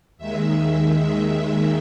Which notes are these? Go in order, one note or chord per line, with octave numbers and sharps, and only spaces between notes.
D#2 D#3 G#3 E5
E5